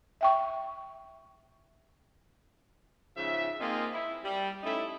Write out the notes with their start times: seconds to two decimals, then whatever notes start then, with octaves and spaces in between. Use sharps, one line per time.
0.21 E5 G5 C#6
3.16 G#2 C#3 F3 E5
3.60 A#3 C4 D#4 F4 G#4
3.93 E4
4.24 G3
4.63 A3 C#4 D#4 E4